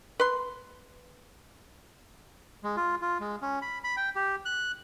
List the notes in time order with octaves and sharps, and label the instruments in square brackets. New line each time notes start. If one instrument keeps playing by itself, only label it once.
[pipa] B4 C6
[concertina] G#3
F4
F4
G#3
C#4
B5
B5
G5
G4
F#6